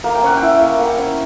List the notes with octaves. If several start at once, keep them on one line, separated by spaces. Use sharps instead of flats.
A#3 A#5
G5
C#4 F#5
E4 G5
A#3
A#3 F#5
C#4